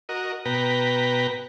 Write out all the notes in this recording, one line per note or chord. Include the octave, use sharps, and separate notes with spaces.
F#4 A#4 D#5
B2 B4 G5 A#5